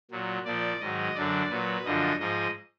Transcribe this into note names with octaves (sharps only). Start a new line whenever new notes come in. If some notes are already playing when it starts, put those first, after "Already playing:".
A#2 F#3
A#2 F3 D5
G#2 D#3 F#3 D#5
F#2 D3 F#3 D5
A#2 F#3 B4
F#2 D3 F3 D#5
G#2 F3 D#5